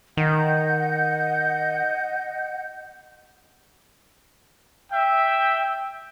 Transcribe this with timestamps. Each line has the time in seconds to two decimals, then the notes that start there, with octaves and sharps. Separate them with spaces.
0.17 D#3 D#5 F#5 G6
4.92 E5 G5